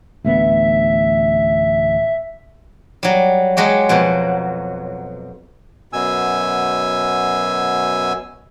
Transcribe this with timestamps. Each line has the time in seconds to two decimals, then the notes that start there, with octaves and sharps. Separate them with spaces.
0.25 A1 D2 B3 E5
3.03 F#3 G3
3.57 F#3 G#3 F#4 G4
3.89 F2 B2 F#3
5.93 F#2 B2 G#5 E6